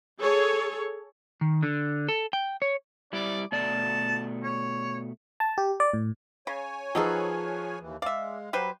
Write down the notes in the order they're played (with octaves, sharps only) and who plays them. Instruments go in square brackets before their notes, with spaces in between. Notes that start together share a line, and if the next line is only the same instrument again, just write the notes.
[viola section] G#4 A4 C#5
[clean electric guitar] D#3
D3
A4
G5
C#5
[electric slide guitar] G3 E4 [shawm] D5
[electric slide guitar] B2 A3 D5 [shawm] A5
[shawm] C#5
[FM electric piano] A5
G4
D5
A2
[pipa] C#3 [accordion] C#5 G#5
[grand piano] F3 G#4 B4 [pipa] F#3 D#4 A4
[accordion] D#2 E3
[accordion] G#3 [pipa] D5 E5 [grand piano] F5
[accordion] F#3 [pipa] G3 B4 C5